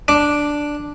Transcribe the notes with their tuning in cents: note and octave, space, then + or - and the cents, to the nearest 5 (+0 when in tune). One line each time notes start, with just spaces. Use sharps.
D4 +0 D6 +0